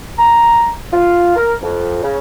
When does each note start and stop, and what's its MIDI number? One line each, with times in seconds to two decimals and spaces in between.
0.18 0.70 82
0.93 1.32 65
1.36 1.53 70
1.63 2.01 41
2.03 2.17 49